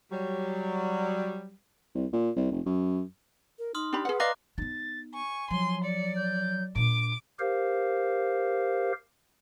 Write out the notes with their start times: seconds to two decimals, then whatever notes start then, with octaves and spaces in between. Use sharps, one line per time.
0.12 F#3 G3
1.95 C2
2.13 A#2
2.36 C2
2.52 F1
2.66 F#2
3.59 A#4
3.75 D#4 C6 D#6 F6
3.93 D4 G4 B5
4.05 G#4 B4 F#5
4.20 D5 D#5 F5 A#5 D6 F#6
4.58 B3 D#4 A6
5.13 G#5 C#6
5.51 F3 F#3 C6
5.83 D5 C#7
6.16 G6
6.76 A#2 D4 D6 D7
7.39 G4 A#4 C5 F5